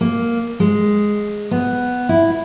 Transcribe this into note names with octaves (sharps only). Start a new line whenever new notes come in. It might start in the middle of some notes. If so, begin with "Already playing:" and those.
A#3
G#3
B3
E4